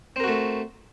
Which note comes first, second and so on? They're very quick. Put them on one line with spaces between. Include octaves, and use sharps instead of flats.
C4 A#4 F#4 A3